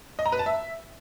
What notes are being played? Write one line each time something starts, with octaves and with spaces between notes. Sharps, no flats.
D#5
A#5
B4
A5
E5